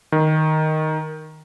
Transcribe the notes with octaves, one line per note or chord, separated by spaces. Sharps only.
D#3